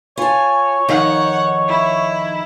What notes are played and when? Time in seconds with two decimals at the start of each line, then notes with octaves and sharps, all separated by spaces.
0.17 F4 C#5 G#5 A5
0.88 F2 D#3 D#4 F#5
1.68 E4